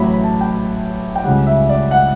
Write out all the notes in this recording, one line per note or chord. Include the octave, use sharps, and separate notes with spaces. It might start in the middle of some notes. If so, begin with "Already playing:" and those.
Already playing: A1 A2 F#3 B5
B5
A5
G5
G5
C#2 C#3 G3 F#5
E5
D5
F#5